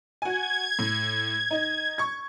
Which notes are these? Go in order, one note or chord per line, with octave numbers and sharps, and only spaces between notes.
F#4 G#5 G#6
A2
D#4
C#6 G#6